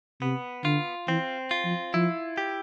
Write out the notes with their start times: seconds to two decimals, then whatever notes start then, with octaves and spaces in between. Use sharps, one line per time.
0.21 C3 B3
0.64 D3 F4
1.08 E3 C4
1.51 F4
1.65 F3
1.94 F3 E4
2.38 G4